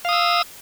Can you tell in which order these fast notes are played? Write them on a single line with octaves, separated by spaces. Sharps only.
F5 D#6 E6